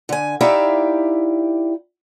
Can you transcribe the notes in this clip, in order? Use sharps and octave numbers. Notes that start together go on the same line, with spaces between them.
D3 G#5
D#4 E4 G4 D5 E5 F5